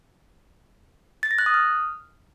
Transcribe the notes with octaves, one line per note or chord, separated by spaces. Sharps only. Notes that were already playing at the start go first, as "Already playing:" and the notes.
A6
A#6
F#6
D#6
F6